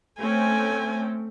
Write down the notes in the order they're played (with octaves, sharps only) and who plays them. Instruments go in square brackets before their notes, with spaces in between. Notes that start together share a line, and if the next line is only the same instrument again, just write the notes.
[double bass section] A3 [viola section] C4 C#4 G5 [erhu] G#5